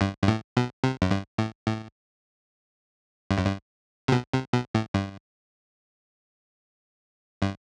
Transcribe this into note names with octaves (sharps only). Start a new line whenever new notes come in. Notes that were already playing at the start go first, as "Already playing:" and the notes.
G2
G2
A2
B2
C3
F#2
G2
A2
A2
G2
F#2
G2
C3
B2
C3
B2
A2
G2
G2